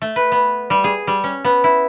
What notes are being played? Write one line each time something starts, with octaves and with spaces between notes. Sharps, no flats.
A3
B4
B3
G3
G#4
G3
C#4
B3
E4